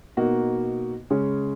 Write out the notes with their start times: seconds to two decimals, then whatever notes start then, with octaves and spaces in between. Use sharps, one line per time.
0.17 B2 A#3 D#4 F#4
1.10 C#3 G#3 C#4